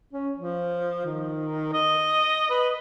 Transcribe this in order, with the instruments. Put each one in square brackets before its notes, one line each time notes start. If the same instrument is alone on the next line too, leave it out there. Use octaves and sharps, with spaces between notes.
[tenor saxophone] C#4
F3
D#3
D#5
B4